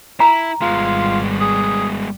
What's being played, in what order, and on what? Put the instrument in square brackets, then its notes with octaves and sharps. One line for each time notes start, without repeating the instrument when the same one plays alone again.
[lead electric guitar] E4 [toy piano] A#5
[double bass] G#1 G3 [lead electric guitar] G#3 B3 [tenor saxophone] F4
[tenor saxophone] G#4